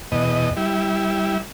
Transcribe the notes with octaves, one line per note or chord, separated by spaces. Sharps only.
E2 B2 D#5
G3 E4